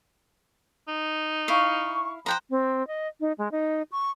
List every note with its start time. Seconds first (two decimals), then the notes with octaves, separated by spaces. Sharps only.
0.88 D#4
1.48 E4 F5 C#6
2.26 F3 C5 G5 A#5 F#6
2.50 C4
2.87 D#5
3.20 D#4
3.38 G#3
3.52 D#4
3.92 C#6